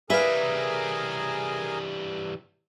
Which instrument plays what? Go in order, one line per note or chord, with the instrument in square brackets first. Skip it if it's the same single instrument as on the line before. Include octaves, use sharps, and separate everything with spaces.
[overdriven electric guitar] E3 G3 [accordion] G#4 A#4 G#5 [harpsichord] B4 F5 [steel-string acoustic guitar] E5